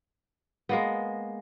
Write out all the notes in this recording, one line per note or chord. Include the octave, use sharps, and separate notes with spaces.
G#3 A#3 B3